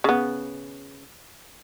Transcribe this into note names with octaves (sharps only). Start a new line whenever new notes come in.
C#3 B3